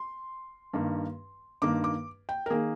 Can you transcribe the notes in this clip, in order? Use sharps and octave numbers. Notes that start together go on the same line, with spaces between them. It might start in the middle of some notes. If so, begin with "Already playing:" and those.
Already playing: C6
G2 D#3 A#3
G2 D#3 A#3 D6
D6
G5
A#4
D#3 A#3 G#4